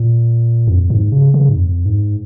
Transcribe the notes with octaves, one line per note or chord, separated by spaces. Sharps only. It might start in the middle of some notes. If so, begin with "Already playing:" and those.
Already playing: A#2
F2
G#2
C#3
C#3
G#2
F2
G#2